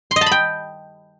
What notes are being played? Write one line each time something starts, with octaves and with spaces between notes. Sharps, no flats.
C6
D#5
A5
B5
G5